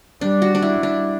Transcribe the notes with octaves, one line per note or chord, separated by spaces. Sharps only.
G3 D4
F#4
D4
E4
G3 D4